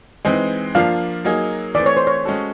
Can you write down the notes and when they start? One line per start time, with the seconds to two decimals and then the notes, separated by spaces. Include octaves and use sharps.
0.25 E3 G#3 C4 D#4
0.75 F3 A#3 D4 F4 F5
1.25 F#3 A#3 D#4 G#4
1.75 E3 A3 C4 D5
1.86 C#5
1.97 C5
2.07 C#5
2.25 G#3 C#4 F#4 A4